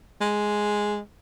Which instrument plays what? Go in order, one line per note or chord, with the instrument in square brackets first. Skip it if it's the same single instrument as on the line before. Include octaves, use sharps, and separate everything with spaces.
[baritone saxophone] G#3